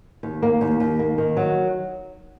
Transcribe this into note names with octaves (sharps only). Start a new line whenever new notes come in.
D#2
A#3
D#2
D#2
A#3
D#3
F#3